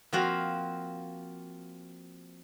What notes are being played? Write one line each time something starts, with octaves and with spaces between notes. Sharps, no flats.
F3 A#3 C4 F#4 F5